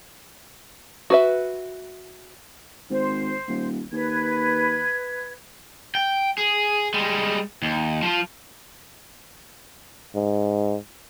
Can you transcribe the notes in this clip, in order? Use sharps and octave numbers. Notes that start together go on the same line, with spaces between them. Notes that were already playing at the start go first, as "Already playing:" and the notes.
F#4 B4 E5
G#1 C5
D#1
D#2 B4 G#6
G5
G#4
G3 G#3
D#2
F3 F4
G#2